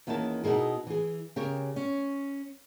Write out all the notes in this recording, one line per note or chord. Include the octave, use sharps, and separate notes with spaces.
E2 D#3 A#3 C#4 E4 A5
B2 D#4 E4 G#4 A#4
E3 G#4
C#3 G4 A#4 C#5
C#4